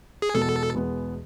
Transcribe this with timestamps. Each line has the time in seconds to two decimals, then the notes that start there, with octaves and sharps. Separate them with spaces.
0.22 G#4
0.34 E2 B2 G#3 B3 A4
0.74 E2 B2 G#3 B3